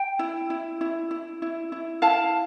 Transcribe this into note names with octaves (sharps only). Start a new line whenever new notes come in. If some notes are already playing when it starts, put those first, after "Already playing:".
Already playing: G5
E4
E4
E4
E4
E4
E4
E4 F5 A5